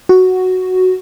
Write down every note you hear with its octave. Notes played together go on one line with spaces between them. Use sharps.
F#4